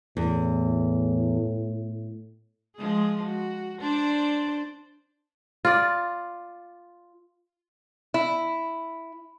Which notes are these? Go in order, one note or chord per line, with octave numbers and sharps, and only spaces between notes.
E2 A2
F3 G#3 G#4
F#4
D4 C5 D5
F4 D5
E4